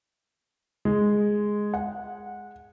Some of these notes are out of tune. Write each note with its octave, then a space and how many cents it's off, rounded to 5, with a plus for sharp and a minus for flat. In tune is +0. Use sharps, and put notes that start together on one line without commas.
G#3 +0
F#5 -15